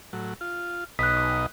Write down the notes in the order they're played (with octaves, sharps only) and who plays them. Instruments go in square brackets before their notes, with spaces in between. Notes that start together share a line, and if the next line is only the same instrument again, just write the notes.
[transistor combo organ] A2 F#3
F4
[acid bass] B1 [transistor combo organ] B2 D#4 D#5 [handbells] F#6 B6